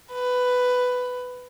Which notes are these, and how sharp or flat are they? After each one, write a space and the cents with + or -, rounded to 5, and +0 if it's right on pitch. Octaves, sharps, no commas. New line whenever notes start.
B4 +10